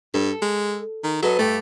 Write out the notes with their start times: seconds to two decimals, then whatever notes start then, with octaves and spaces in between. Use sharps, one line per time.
0.14 G2 A4
0.42 G#3
1.04 D#3
1.23 F#3 A4 B4 D#5
1.39 G2 G3 A3 G4